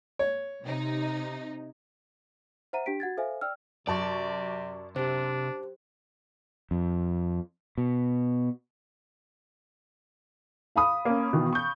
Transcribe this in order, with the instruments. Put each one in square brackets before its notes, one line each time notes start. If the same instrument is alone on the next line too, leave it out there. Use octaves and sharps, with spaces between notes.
[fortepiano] C#5
[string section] C3 D#4
[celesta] C5 E5 F#5 A#5 D#7
D4 G4 G5 B6 D7
F#4 F#5 G#6 A6
A4 C5 E5 F5 G#5
D5 G5 E6 F6
[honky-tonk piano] F#2 A5 C#6 [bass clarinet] C3 [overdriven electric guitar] D5
[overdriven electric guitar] C3 [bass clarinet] D4 [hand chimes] G4 C5
[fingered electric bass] F2
B2
[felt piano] F5 B5 D#6
[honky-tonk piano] A#3 C#4
B2 D#3 E3
C#6 G6